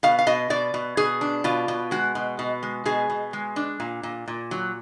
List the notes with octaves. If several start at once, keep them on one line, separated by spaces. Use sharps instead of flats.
B2 F5
F5
B2 D#5
B2 D5
B2
B2 G#4
D4
B2 F4
B2
G#3 F#4
B2
B2
G#3
B2 G#4
B2
G#3
D4
A#2
A#2
A#2
F#3